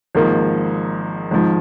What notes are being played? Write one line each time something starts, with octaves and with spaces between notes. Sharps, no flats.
G#1 G#2 F3 A#3
G#1 G#2 F3